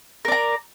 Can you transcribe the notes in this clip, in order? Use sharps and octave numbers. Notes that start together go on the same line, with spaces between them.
A#4 D5 A#5